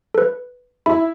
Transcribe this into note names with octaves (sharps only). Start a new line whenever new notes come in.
A4 B4
E4 B5